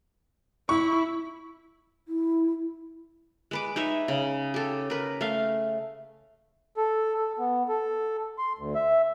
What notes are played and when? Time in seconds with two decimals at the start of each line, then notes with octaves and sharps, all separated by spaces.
0.69 E4 C#6
2.08 E4
3.51 G#3 B4 D6
3.76 D#4 B4 C#5 E5
4.08 C#3
4.54 G4 A4
4.90 A#4 B4
5.21 A3 F5
6.77 A4
7.17 A4
7.39 B3
7.69 A4
8.38 C6
8.59 D2
8.75 E5